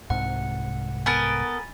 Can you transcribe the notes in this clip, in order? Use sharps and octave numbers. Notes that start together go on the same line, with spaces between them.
C2 G#2 C3 F#5
B3 A4 A#4 G#5 B5 A6